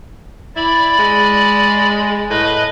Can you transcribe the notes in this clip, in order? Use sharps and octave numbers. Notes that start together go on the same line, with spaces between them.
E4 D5 B5
G#3
A2 B4 D#5 B5